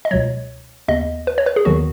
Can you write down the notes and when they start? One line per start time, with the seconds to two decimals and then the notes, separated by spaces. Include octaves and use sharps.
0.05 D#5
0.11 C#2 B2 F#3 C#5
0.88 D#2 C#3 B3 D#5
1.27 B4
1.38 C#5
1.46 B4
1.56 G#4
1.65 D#2 D#3 F#3 B3 F#4